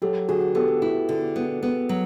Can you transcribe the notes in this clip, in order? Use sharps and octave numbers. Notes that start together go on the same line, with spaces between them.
F#3 G4 A4
D3 F#4 G#4
B3 G4 A4
E4
D3
B3
B3
F#3